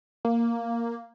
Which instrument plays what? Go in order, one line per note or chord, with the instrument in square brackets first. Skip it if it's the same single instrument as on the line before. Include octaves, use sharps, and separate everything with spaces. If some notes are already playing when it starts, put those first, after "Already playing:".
[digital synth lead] A#3